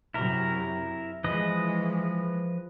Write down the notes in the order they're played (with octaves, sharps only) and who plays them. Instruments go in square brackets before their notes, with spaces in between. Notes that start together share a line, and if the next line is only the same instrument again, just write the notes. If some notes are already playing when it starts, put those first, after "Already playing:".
[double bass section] F#2 C3 [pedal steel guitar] E4 A#4
[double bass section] E3 G#3 [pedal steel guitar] F3 B4 D#5